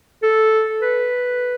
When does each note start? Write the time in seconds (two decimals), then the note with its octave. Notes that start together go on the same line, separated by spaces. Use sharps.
0.23 A4
0.81 B4